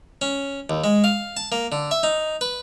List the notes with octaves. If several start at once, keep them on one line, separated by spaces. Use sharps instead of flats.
C#4
D#2
G#3
F5
A5
A#3
D3
E5
D#4
B4